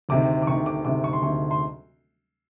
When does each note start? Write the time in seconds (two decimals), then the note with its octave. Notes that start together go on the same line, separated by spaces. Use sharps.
0.09 D2 C3 D#3 D6
0.42 D6
0.47 D2 C3 D#3 C#6
0.66 D6
0.85 D2 C3 D#3 D6
1.04 C#6
1.13 C6
1.23 D2 C3 D#3 C#6
1.51 C6